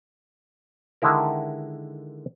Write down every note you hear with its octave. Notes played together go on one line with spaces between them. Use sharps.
D3 D#3 G#3 E4 A#4